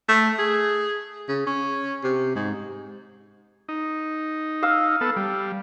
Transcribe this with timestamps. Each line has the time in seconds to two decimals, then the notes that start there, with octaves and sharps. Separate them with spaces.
0.09 A3
0.39 G#4
1.28 C#3
1.47 C#4
2.04 C3
2.36 G#2
3.69 D#4
4.63 F5 E6
5.01 B3 A4
5.16 G3